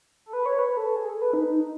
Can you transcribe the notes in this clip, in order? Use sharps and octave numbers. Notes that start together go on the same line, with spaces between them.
A4
B4
C#5
B4
A4
G#4
A4
B4
D#4
D#4